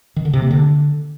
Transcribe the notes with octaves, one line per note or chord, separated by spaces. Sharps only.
D#3
D3
C3
A#3
D3